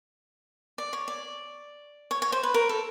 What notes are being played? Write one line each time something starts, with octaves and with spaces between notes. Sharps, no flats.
D5
C#5
D5
C#5
C#5
C5
B4
A#4
A4